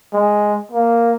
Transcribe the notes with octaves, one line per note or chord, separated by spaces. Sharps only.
G#3
A#3